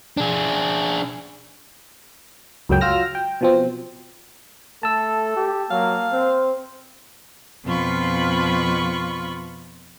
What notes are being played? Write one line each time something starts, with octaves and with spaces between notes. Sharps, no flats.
D4 G#4
C#2 F#2 F#3 G5
F#3 F4 E6 F6 A#6
G5
B2 F3 C4
A3 A4 A5 E6
G4
F#3 A#3 F5
C4 C5
F2 B2 F4 B5 C#6